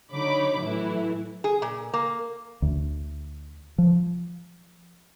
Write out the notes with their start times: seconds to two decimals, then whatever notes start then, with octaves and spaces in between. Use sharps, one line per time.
0.13 D3 F#3 D#4 C#5 B5 D6
0.63 A2 E3 F#3 A3 E4
1.44 G#4
1.62 A#2
1.93 A#3
2.62 D2
3.78 F3